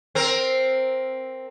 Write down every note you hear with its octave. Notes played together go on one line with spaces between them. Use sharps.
C4 A#4